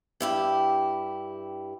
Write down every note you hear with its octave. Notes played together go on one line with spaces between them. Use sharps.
G2 E4 G4